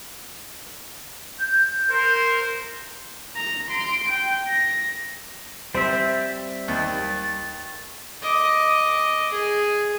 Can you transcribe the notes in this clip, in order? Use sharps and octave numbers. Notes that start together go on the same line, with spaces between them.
G6
A#4 C5
A#5
C6 D7
G5
A#6
G3 C4 C5 E5
D#2 A6
D#5 D6
G#4